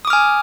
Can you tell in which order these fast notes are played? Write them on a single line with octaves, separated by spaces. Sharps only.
D#6 D6 F6 G#5